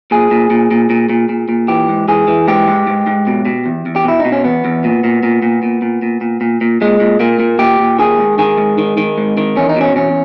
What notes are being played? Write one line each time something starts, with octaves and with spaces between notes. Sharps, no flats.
A#2 G#4
A#2
A#2
A#2
A#2
A#2
A#2
A#2
E3 G4
G#2
E3 G#4
E3
G#2 G4
G#2
G#2
G#2
B2
B2
E2
E2
G4
B2 E4
D#4
B2
C#4
E2 B3
E2
A#2
A#2
A#2
A#2
A#2
A#2
A#2
A#2
A#2
A#2
A#2 G#3
A#2
A#2 A#3
A#2
A#2 G4
A#2
D#3 G#4
G#2
D#3 G#4
G#2
D#3
D#3
G#2
D#3
E2 C#4
D#4
B2 C#4
E2 C#4